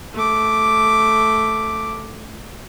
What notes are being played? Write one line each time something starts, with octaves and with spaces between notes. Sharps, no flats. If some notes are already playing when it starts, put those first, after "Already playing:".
A3 D6